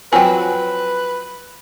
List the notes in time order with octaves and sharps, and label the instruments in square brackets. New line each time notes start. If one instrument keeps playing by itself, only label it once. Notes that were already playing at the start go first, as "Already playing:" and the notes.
[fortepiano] F3 F#3 C4 [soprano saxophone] B4 [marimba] G5 G#5